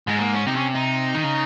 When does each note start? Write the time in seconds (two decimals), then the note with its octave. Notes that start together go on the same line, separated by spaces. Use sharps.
0.07 G#2 G#3
0.17 C4
0.20 A#3
0.34 C#4
0.46 C3 D#4
0.56 C#4
0.75 D#4
1.15 D#3
1.24 C#3